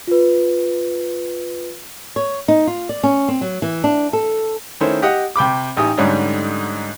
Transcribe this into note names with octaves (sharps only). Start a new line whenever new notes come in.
F4 B4
C#5
D#4
F4
D5
C#4
C4
F#3
E3
D4
A4
D#3 A3 C#4 E4 C5
G4 D#5 F#5
C3 G5 B5 D6
A1 D#4 G4 G#5 D#6
G#2 D3 G3 A3 C#4 D#4